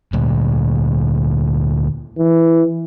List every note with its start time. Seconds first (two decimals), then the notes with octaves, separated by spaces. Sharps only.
0.13 D2 A#2
2.18 E3